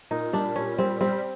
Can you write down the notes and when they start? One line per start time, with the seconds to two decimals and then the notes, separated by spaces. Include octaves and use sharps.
0.11 A#2 D#4
0.33 G3 D4
0.56 A#2 C#4
0.78 G3 C4
1.01 G3 C4